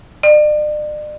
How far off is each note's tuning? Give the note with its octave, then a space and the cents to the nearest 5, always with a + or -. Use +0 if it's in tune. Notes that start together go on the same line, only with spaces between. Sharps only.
D5 +40